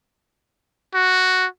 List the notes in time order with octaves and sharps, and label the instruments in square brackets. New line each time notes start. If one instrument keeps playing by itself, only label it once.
[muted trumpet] F#4